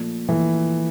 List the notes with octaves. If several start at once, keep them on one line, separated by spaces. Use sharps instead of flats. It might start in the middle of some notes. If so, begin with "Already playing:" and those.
Already playing: A#2 F3 A3
A#2 E3 F3 A3